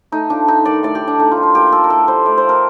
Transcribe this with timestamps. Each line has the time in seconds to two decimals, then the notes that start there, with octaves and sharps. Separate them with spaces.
0.12 A3 D#4
0.30 F3 D4
0.47 G3 D#4
0.65 D#3 D5
0.83 A2 D5
0.95 G4
1.01 G3
1.08 D4
1.19 A3 D#4
1.32 F4
1.37 F3
1.43 F4
1.54 A#2 G4
1.72 G3 A4
1.84 A#4
1.90 A2 A4
2.08 G3 C5
2.26 A3 D5
2.38 C5
2.44 F3 A#4